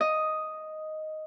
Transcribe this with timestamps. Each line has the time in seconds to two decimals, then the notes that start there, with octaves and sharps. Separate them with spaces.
0.01 D#5